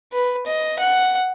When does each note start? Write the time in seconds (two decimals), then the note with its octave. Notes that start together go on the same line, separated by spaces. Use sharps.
0.13 B4
0.47 D#5
0.79 F#5